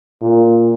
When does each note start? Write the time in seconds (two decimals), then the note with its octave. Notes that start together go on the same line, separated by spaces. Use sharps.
0.22 A#2